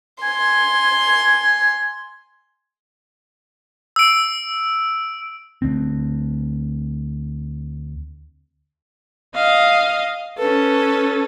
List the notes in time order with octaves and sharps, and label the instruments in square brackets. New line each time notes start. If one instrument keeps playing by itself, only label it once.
[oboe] G#5 [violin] C6
[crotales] E6 D7
[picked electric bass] D2 C4
[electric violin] D#5 F5
[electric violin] C#4 A4 [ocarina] B4